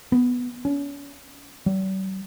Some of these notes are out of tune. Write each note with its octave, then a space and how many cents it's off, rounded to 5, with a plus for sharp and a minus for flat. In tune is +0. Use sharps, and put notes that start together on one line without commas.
B3 +0
C#4 +35
G3 -45